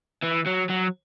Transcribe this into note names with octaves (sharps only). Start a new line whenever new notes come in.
E3
F#3
F#3